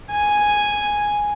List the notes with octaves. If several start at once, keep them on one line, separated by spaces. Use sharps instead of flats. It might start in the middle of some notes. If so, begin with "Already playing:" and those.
G#5